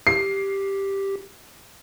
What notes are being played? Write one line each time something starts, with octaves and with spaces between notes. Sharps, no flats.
G4 C7